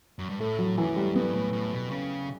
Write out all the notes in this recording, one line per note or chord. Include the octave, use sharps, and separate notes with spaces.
F#2
G2
A2 A3
F#3
F#2 E3
G3
G2 B3
A2
A2
B2
C#3